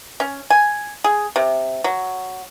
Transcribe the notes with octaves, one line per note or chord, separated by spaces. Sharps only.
C#4
G#5
G#4
C3
F#3